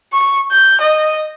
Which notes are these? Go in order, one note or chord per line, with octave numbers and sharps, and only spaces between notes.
C#6
G6
D#5